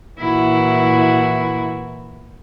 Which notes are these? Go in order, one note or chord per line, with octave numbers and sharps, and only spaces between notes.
A#2 E3 E4 F#4